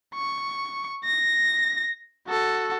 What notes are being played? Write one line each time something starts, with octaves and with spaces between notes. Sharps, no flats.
C#6
A#6
F#4 A4